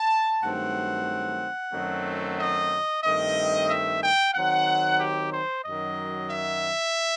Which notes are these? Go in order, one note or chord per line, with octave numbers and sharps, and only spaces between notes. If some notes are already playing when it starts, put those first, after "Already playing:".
Already playing: A5
G2 D#3 F#3 A3 C4 F#5
F#2 D#3 F#3 A3 C4
D#5
G2 D#3 A3 C4 D#5
E5
G5
D#3 F#3 C4 F#5
G4
C5
F#2 D#3 F#3 D#5
E5